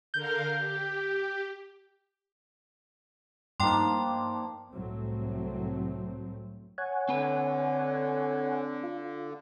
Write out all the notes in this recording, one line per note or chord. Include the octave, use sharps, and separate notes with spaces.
D3 A#4 F5 G6
G4
G2 F3 A#3 D4 D#4 G5 C6
C2 A2 F#3 A3 C4
C#5 F#5 G#5
D3 C4 B4
F4